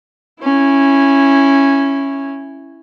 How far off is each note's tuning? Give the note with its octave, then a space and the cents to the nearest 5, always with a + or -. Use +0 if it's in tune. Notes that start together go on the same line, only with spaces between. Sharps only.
C#4 -10 E4 +0